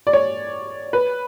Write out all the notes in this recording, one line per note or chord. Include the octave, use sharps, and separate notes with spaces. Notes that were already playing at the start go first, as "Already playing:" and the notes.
D5
C#5
B4